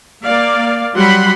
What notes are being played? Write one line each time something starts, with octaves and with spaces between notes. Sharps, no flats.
A#3 D5 F5
F#3 G3 F#5 B5 C6